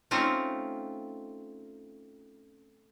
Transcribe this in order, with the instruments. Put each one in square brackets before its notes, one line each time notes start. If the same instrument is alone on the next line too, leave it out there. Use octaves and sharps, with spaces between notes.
[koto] A3 C4 C#4 D#4 F4